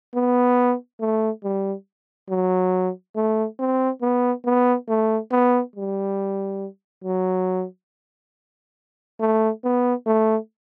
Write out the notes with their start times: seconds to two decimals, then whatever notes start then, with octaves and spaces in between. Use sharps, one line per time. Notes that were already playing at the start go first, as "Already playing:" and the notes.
0.15 B3
1.00 A3
1.44 G3
2.30 F#3
3.16 A3
3.59 C4
4.02 B3
4.45 B3
4.89 A3
5.31 B3
5.76 G3
7.04 F#3
9.20 A3
9.64 B3
10.07 A3